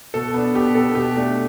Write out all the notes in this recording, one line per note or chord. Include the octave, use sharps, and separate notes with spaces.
B2 A4
B3 D4
B2 G4
B3 D4 A4
B2 G4
A3 D4